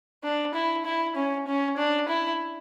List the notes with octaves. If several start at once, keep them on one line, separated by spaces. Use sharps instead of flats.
D4
E4
E4
C#4
C#4
D4
E4